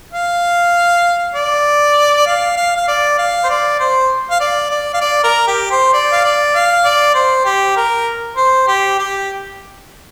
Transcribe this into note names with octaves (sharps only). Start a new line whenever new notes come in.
F5
D5
F5
F5
F5
D5
F5
C5
D5
C5
F5
D5
D5
F5
D5
A#4
G4
C5
D5
F5
D5
F5
D5
C5
G4
A#4
C5
G4
G4